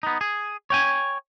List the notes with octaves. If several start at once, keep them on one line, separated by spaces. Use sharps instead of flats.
B3 D#4
G#4
C#5 G5 G#5